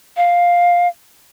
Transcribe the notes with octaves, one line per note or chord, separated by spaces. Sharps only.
F5